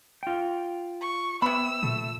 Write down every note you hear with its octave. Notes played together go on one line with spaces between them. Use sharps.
F4 G5
C#6
C3 B3 B5 E6
A#2 A3